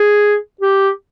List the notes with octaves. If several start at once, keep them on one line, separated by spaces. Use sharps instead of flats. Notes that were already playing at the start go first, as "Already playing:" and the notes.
Already playing: G#4
G4